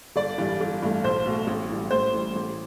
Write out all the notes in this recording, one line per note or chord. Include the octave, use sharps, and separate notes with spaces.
G1 D5
G2 E3 G3
G1
G2 E3 A3
B1 C5
B2 A3
A1
A2 E3 G3
A1 C5
A2 E3 G3
A1